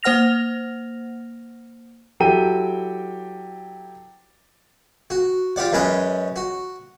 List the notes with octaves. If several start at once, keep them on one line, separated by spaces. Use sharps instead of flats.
A#3 C5 F#5 F6 A#6 F7
F#3 E4 G4 A4 G5 D#7
F#4
F4 G4 D5 F#5
F#2 G#3 C#4 B4 D#5
F#4